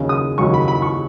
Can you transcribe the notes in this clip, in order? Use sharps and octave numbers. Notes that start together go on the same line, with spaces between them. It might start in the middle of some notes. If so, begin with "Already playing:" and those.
Already playing: D#2 C#3 F#3 C#4
D#6
D#2 C#3 F#3 C#4 C#6
B5
B5
C#6